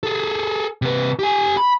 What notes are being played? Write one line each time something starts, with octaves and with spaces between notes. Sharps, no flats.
G#4 A4
C3 B4
G4 G#5
B5